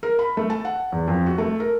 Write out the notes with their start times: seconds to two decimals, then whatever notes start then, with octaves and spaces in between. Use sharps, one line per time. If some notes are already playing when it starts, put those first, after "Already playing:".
0.03 A#4
0.19 B5
0.37 A3
0.50 A5
0.65 F#5
0.92 E2
1.08 F2
1.26 F#4
1.38 A3
1.60 A#4